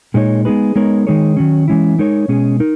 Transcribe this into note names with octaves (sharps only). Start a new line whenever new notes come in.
A#2 G#3 D#4 A#4 C#5
G#3 B3 D#4 G#4 B4
G#3 B3 D#4 A#4 C#5
D#3 G#3 D#4 G#4 C#5
D#3 F#3 C#4
E3 G#3 C#4 E4
G#3 D#4 A#4 C#5
B2 G#3 C#4 G#4
D#4 A#4